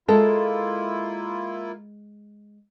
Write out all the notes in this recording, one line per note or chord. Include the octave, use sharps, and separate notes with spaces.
G#3 A#3 E4 F4 A4